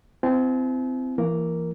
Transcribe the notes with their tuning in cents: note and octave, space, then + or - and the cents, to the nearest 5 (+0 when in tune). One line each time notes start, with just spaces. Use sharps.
C4 -25 E4 +35 G#5 +45
E3 +30 A#3 +0 A#4 +0